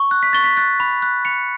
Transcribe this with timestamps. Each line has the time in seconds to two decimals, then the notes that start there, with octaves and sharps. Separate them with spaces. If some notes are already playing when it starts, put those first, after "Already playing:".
Already playing: C#6
0.11 F#6
0.23 B6
0.33 C#6 A6
0.44 B6
0.57 F#6 A6
0.80 B5
1.02 F#6
1.25 B5 C#7